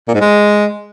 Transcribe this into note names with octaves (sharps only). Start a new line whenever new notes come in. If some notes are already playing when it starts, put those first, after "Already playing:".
A#2
G#2
G#3